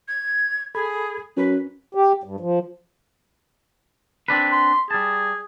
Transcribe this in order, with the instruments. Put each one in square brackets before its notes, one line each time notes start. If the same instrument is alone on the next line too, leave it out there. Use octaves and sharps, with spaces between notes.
[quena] G#6
[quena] G#4 [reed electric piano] A4 B5 G#6
[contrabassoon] F#2 [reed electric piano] C#4 [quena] B4
[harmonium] G4
G2
F3
[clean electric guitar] C4 D4 B4
[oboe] C6
[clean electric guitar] G3 A5 [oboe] G#4